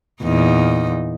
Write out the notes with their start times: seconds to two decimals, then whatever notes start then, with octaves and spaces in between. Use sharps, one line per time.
0.23 E2 A#2 D#4